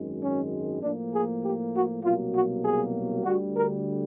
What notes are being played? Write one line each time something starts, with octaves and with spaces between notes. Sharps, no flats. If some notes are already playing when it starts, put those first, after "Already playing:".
Already playing: G#1 F#2 D#3 G#3
C#4
A2 F3 A#3 D4
G#4
G4
F#4
C2 B2 F#3 A#3 F4
F#4
G#4
D2 D3 G3 F#4
A#4